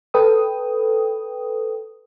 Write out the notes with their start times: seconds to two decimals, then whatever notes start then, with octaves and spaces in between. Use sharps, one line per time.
0.14 A4 B4 G5 D#6